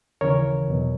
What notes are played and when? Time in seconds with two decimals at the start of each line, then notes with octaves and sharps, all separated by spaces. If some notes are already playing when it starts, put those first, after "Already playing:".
0.21 D#2 C#3 E3 A#4 C#5
0.68 E2 B2 F#3